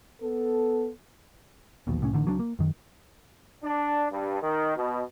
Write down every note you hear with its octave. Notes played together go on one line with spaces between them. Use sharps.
B3 A4
E1 A#1 D#2 B2
C2 A2 F#3 C#4
A1 D3 D#3
C#2 F#3 A3 D4
A#3
F#2 D#3
D4
G2
D#3
B2